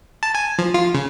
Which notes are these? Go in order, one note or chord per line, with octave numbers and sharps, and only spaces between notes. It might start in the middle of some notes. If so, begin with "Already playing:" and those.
A5
G#5
F3
F4
C#3